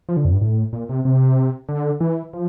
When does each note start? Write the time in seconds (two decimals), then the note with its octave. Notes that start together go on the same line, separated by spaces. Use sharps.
0.09 F3
0.17 D3
0.25 F2
0.32 G2
0.41 A2
0.73 A#2
0.89 C3
1.05 C3
1.68 D3
2.00 E3
2.33 F3